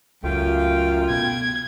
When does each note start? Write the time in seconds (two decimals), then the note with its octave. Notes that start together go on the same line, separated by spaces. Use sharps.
0.24 C#2 F#2 A3 F4 G5
1.10 B2 G#6